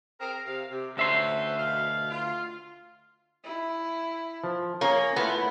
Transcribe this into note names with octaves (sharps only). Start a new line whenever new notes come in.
C4 G#4 A#4
C3 F5
C3
D2 C#4 B4 C5 E5 C6
B2 F5
F4
E4
F3
A#3 C#4 G#4 C#5
A3 B3 E4 F4 B4